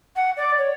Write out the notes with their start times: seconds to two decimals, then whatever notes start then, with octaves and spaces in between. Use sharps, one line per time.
0.15 F#5
0.36 D5
0.58 C#5